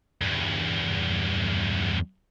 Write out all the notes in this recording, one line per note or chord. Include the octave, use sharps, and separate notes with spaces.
E2 G2